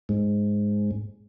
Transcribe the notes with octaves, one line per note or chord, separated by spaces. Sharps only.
G#2